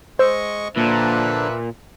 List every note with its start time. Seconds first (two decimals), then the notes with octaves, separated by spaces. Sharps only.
0.19 G#3 C5 D#5 C#6 E6
0.76 A#2 D3 F3 D4 B4 E5